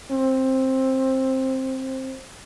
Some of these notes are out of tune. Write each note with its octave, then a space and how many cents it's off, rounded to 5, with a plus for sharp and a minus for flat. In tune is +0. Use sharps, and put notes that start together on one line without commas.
C4 +10